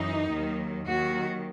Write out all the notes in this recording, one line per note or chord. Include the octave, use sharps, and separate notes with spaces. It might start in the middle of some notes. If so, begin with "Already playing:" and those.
Already playing: F#2 E3 D#4
D#2 D#3 F#3
D#2 D#3 F#3 F#4